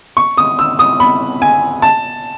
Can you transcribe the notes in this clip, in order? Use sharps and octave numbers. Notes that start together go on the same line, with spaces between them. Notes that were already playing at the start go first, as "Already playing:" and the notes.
C#6
D#6
E6
D#6
B5
G#5
A5